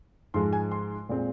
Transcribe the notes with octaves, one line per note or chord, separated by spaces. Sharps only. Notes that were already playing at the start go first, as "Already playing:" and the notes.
G#2 F3 G#3 C6
G#5
C6
A#2 G#3 C4